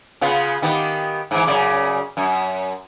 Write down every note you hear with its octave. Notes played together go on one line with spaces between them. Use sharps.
C#3 B3 F4
D#3 B3 G4
G#2 E3
F#2 C#3 D5
F#2